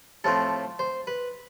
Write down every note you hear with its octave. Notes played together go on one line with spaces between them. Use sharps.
A2 F3 A3 C4 A4
C5
B4